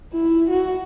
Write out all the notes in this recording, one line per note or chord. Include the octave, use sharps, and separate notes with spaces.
E4
F#4